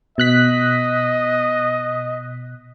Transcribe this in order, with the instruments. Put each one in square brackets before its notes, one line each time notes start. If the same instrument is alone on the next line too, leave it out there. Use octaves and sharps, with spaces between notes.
[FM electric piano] B2 F#6 B6 [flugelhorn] D#5